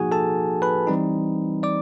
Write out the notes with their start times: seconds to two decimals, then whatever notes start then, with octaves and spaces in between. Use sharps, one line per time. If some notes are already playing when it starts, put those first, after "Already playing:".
Already playing: F3 A#3 D#4 F#4 G#4 F#5 G#5
0.12 A4 A5
0.62 B4 B5
0.87 E3 G3 C4 D#4
1.63 D5 D6